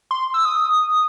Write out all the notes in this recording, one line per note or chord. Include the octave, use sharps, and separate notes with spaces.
C6
E6
D#6